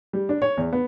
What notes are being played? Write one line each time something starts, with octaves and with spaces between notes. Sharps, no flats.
G3
D4
C#5
E2
B3